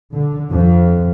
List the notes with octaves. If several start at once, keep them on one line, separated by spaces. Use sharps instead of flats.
D3
F2